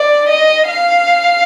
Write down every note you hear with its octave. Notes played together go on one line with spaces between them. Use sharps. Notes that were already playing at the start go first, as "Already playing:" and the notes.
Already playing: D5
D#5
F5